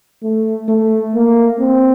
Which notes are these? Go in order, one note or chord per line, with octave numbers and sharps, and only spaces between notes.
A3
A3
A#3
C4